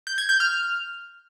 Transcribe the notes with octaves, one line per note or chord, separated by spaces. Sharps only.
G6
G#6
G6
F6